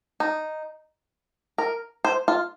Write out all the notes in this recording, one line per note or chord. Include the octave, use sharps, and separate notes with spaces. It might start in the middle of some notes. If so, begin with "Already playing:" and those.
D#4
A#4
C5
F4